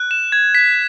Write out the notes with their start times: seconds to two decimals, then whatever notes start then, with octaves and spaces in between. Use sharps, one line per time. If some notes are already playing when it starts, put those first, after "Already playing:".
Already playing: F#6
0.11 E7
0.32 G#6
0.55 B6